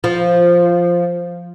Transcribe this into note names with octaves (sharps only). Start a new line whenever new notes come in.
F3